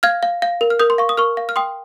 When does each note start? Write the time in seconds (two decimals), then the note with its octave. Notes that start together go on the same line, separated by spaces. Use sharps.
0.03 F5 F6 G#6
0.23 F5
0.42 F5
0.61 A#4
0.70 F6
0.79 A#4 D#6 G6
0.90 C6
0.98 F5 C#6
1.09 D#6
1.17 A#4 C#6 F6
1.37 F5
1.49 F6
1.56 G5 C6 D#6